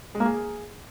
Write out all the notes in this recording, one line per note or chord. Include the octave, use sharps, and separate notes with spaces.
G#3
A#3
G#4